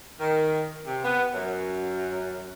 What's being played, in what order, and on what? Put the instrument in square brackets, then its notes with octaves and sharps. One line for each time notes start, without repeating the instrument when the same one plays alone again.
[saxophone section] D#3
C3
B3
F#2